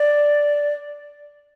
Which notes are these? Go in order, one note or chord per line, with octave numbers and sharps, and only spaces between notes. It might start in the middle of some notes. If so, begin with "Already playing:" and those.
Already playing: D5